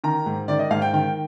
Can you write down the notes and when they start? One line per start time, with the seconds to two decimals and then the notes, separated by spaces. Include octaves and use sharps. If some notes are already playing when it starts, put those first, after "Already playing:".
0.04 D#3 A#5
0.26 G#2
0.48 D#3 D5
0.59 D#5
0.71 G#2 F5
0.82 G5
0.93 D#3 G5